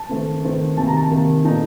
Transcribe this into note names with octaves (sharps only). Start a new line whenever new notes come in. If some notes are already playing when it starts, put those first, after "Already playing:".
Already playing: A5
D#3 A3 C4
D#3 A3 C4
C3 D#3 A#3 A5
A#5
A5
C3 D#3 A#3
A#2 A3 D#4 A5